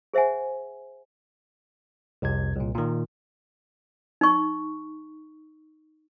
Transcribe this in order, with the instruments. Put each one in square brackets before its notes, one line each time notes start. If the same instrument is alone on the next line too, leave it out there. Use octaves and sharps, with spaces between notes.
[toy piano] G#4 C5 E5 F#5 G#5
[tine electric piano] C2 F2 C3 G#6
C2 A#2
A#2 D#3
[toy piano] D#4 C#6